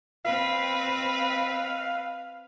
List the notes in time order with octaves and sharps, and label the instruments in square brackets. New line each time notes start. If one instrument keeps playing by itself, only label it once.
[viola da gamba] C4 B4 [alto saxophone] F5